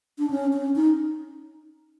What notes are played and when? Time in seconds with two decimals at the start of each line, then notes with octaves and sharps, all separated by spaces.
0.19 D4
0.30 C#4
0.53 C#4
0.76 D#4